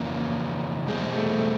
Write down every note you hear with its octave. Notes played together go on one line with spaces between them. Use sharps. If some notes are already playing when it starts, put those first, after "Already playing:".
Already playing: F2 C#3 E3 A#3
E2 B2 G3 G#3 C4
A3